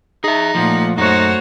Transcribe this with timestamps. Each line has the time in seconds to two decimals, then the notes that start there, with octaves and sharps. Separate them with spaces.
0.24 D#4 G#4 E5
0.55 A#2 F3 A3 F#5
0.98 F#2 A3 D#4 F#4 C5 C#5